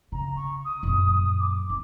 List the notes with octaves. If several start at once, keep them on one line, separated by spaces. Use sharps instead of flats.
C#3 A#5
C#6
D#6
F#2 A#2
D6
D#4